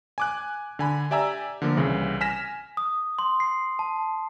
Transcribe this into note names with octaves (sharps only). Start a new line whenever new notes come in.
G#5 D6 F#6
D3 G#5 B5
G4 D5 E5 G#5 A#5 E6
D3 F3 A#3
C2 C#3 E3
G#5 F6 A#6 B6 E7
D#6
C6
C7
A5